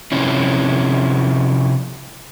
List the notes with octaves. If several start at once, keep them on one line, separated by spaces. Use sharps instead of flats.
C3 F3 C#4 E4